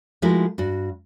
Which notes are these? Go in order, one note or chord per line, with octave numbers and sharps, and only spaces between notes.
F3 G#3 A3 E4 F#4 A#4
G2 F#4